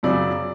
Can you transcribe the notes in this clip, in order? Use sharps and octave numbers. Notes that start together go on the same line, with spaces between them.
F#2 C#3 F#3 D5